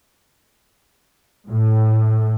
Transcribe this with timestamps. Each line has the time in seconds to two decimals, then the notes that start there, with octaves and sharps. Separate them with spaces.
1.50 A2